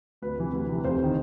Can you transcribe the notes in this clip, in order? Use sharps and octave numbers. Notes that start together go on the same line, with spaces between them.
D2 B4
C3 E3
D2
C3 E3
F1 C5
D#3